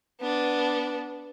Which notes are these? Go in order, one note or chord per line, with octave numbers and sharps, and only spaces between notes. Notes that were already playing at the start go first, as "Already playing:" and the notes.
B3 D4